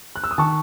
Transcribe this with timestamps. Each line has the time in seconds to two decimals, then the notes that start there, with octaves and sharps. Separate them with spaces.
0.16 F#6
0.24 E6
0.31 D#6
0.38 D#3 A5 C#6